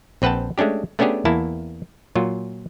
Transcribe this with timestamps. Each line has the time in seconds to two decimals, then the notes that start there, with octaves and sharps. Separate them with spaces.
0.22 A#1 C4 B4 F#5 G5 A5
0.58 G#3 A3 C#4 D4 G4
0.99 A3 B3 C#4 D4 G4 G#4
1.25 E2 E3 A#3 E4 A5
2.15 A#2 F#3 F4